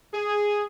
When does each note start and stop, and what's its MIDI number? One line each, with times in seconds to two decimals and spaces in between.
0.14 0.64 68